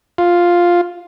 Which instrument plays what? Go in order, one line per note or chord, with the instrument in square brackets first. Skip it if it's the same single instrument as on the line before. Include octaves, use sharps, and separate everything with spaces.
[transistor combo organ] F4